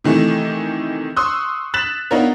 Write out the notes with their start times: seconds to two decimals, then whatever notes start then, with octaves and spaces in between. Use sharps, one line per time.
0.04 C3 D#3 E3 A3
1.16 C6 C#6 D#6 E6 F#6
1.74 F#6 A6 B6 E7 F#7
2.11 B3 D4 D#4 F4 A#4 C#5